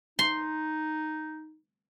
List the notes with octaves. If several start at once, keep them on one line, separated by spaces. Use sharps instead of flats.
D#4 C6